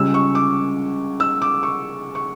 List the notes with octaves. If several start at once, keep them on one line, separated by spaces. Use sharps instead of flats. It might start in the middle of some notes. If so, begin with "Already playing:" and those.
Already playing: C#2 C#3 G3 C#4 E6
C#6
D6
E6
D6
C#6
C#6